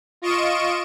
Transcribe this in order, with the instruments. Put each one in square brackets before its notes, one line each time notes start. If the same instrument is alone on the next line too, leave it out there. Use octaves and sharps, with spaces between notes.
[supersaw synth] F4 D#5 C#6 D7 E7